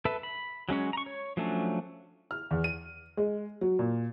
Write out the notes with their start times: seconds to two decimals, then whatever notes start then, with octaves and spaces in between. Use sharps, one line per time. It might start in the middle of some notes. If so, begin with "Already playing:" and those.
0.05 A4 B4 E5
0.23 B5
0.69 F#3 G#3 C#4 C#5
0.93 A#5 C#6
1.06 C#5
1.37 F3 F#3 A3 C#4 D4
2.31 F6
2.51 E2
2.64 D#7
3.17 G#3
3.61 F#3
3.79 A#2